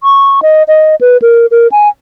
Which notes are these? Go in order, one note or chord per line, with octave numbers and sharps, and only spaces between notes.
C#6
D#5
D#5
B4
A#4
A#4
G#5